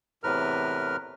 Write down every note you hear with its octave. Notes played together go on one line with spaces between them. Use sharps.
E2 A2 C3 A#4 B4 F6